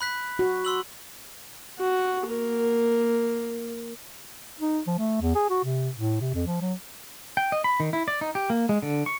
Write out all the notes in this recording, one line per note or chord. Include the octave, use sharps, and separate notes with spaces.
B5 F#6 B6
F#4
C6 E6 F#7
F#4
A#3 A#4
D#4
F3
A3
E2
G#4
F#4
C3
A2
C3
F2
F3
F#3
G5
D#5
B5
D#3
E4
D5
D#4
G4
A#3
G#3
D3
C#6